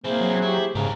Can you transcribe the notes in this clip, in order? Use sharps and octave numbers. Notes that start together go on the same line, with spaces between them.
A#3 C4 E4 G#4 C5
F#3
E4 G4
G#2 C#3 G4 A#4